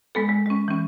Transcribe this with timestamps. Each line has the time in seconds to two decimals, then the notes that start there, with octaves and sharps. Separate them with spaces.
0.15 G#3 B3 A4
0.29 G#3
0.46 G#3 C#4
0.68 E3 C#4